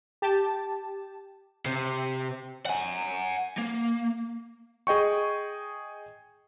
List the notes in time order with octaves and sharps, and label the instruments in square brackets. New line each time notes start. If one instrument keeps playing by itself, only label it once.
[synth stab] G4 A5
[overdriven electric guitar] C3
F#5 G#5
A#3
[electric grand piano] G#4 D#5 G5 C#6